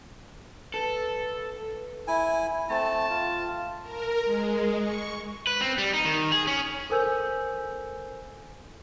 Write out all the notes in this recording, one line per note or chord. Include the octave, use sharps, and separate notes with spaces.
A4 B4
E4 G#5
A3 C4 A5
F4
A#4
G#3
C#6
B4
C4
G3
D#4
D#3
G#4
C#4
A4 A#4 C5 G#5 E6 G6